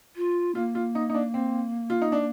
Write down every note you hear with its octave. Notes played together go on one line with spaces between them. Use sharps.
F4
A#3 F4
F4
D#4
D#4
D4
C4
F4
D#4
D4